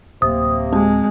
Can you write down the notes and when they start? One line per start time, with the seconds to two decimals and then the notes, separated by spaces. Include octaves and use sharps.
0.22 D1 C3 A#3 D#6
0.73 G#3 C4